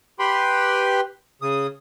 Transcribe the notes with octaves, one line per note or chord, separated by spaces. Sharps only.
G4 B4 G5 B5 C6
C#3 D#6